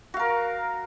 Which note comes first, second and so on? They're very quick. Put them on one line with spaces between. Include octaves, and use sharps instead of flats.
F#4 F5 A#4